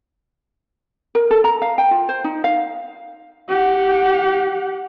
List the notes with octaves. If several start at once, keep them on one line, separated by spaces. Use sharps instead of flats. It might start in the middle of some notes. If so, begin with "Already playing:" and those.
A#4
A4
A#5
F5
G5
F4
C5
D#4
F5
G4 F#5